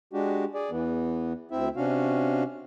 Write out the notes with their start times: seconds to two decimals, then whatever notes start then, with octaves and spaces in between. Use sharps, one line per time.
0.13 G#3 D4 F#4 G4
0.54 G#4 D5
0.71 E2 E3 B3
1.51 D2 C4 E4 E5
1.76 C3 C#4 D4 F#4 F5